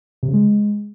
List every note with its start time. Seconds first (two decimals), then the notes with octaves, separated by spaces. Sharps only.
0.23 C3
0.28 C#3
0.34 G#3